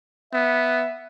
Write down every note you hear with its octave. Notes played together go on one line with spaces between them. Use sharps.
B3 E5